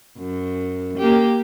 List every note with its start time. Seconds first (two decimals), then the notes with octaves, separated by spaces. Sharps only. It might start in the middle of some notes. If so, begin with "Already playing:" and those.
0.19 F#2
0.98 A#3 G4